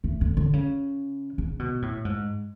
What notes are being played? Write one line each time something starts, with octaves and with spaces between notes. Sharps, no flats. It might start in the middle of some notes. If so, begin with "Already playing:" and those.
A3
D3
D3
C#3
C#3
B2
A2
G#2